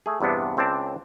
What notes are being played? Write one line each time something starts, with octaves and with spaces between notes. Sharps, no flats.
A3 G#4
E2 G2 C3 B3 D4
C#2 C4 D4 D5 A5